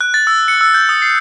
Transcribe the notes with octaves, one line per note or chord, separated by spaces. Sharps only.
F#6
A6
E6
C#7
E6
G6
D#6
C7